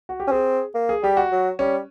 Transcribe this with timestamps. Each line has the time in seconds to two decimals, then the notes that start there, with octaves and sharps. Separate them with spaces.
0.09 F#4
0.20 G4
0.27 C#4
0.32 C4 G#4
0.75 A#3
0.89 G#4
1.03 G3 G4
1.17 F#4
1.32 F#3
1.59 G3 C#4